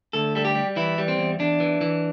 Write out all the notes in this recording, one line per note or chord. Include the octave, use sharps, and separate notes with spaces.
D2 A4
G3 A4
G4
G3
E3 E4
G3
C4
E2
E2 D4
E3
E3